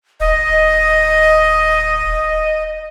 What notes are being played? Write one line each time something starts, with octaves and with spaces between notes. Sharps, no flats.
D#1 D#5